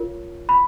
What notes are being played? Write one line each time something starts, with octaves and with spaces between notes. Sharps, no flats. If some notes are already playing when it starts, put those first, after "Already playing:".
Already playing: F4 A#4 C#5
B5